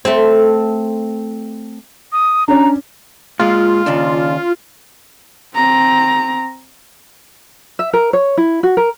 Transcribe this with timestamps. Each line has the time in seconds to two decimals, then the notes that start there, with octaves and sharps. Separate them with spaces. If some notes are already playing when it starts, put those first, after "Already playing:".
0.05 A3 C4
2.12 D#6
2.48 C#4 D4 A#5
3.40 A#2 G#3 F4
3.86 D#2 C#3 D4
5.55 C4 A#5
7.79 E5
7.93 A#4
8.13 C#5
8.37 E4
8.63 F#4
8.77 A#4